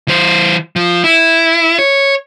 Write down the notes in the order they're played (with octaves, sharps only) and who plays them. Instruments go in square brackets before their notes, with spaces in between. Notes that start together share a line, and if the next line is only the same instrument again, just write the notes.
[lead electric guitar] E3 C5
F3
E4
C#5